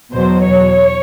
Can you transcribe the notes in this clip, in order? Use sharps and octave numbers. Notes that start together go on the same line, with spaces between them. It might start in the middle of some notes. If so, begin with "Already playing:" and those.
E2 B2 F#3 C5
C#5